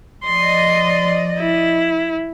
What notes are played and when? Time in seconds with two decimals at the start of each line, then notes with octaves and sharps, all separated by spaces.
0.25 F3 D5 D#5 C6
1.39 E4